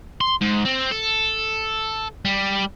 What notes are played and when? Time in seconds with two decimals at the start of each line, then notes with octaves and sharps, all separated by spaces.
0.21 C6
0.41 G#2
0.65 C4
0.91 A4
2.25 G3